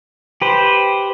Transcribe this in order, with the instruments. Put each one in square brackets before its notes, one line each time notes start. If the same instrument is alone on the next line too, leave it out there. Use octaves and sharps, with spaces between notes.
[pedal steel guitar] G4 B4 C5